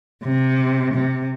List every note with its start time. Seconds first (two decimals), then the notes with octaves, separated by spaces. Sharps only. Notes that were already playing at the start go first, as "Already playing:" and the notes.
0.22 C3
0.93 C3